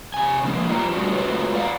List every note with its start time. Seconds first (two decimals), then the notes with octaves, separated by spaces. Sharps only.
0.14 C3 G#5
0.45 D3 F3 G#3 A#3
0.69 F2 F4 G4 A#5
0.92 G3 A3 D4 F#4 G4
1.12 G#3 A3 F4 F#4 B4 C#5
1.55 D5 F5 F#5 A#5